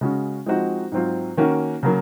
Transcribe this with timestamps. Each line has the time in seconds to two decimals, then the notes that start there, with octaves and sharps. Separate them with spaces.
0.01 C#3 G#3 C#4 F#4
0.46 F3 G#3 C4 D#4 F#4
0.92 G#2 F#3 C4 F4
1.37 D#3 A#3 C#4 F#4
1.83 C#3 F#3 A#3